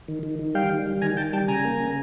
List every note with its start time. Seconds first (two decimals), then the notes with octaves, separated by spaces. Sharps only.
0.08 D#3
0.23 D#3
0.39 D#3
0.55 G3 F5 G5
0.70 D#3
0.87 G3
1.02 D#3 G#5 A#5
1.17 D#3 G5 A5
1.33 G3 G5 A5
1.48 C#3 G#5 A#5
1.65 A#3
1.80 C#3